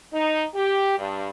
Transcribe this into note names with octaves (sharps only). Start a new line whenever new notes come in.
D#4
G4
G2